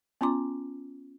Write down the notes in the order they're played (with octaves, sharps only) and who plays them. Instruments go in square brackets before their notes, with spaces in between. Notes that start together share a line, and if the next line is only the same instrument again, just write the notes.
[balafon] B3 C#4 F4 A#5 C6 D6